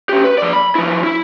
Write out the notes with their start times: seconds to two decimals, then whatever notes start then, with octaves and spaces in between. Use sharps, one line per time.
0.09 C#4 G4
0.24 B4
0.38 F3 D5
0.53 B5
0.75 F3 E4
1.04 E4